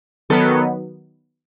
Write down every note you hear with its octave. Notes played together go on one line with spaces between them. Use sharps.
D#3 F#3 B3 A4 B4